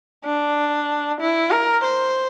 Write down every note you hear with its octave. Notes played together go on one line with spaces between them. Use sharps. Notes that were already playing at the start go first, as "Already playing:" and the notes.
D4
E4
A#4
C5